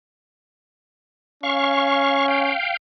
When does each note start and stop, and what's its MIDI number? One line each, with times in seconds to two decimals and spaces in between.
1.43 2.53 61
1.43 2.26 77
1.43 2.26 85
2.28 2.77 77
2.28 2.77 79